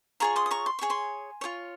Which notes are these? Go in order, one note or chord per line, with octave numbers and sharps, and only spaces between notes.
F4 G#4 C#5 A#5 C#6
C6 D#6
D#6
A#5 C#6
C6
F4 G#4 C#5 C#6
G#5 C6
F4 G#4 C#5